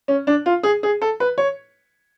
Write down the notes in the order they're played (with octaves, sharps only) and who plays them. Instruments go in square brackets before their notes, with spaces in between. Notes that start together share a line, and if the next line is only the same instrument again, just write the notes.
[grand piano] C#4
D4
F4
G#4
G#4
A4
B4
C#5